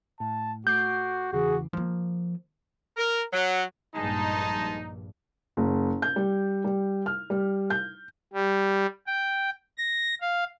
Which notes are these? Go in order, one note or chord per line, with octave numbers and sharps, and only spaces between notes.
A2 A5
A3 F#4 D6 G6 C7
E2 C#3 E3 F#4 G#4
F3 A#3
A#4
F#3
A#1 G2 G#3 D#4 A5
F#1
G6
G3
G3
F6
G3
G6
G3
G5
A#6
F5